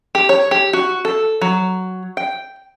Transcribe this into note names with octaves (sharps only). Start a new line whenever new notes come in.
G4
C#5
G4
F#4
A4
F#3
G5